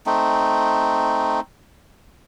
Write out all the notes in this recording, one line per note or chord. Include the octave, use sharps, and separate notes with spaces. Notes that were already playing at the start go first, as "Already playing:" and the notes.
A3 C4 D#4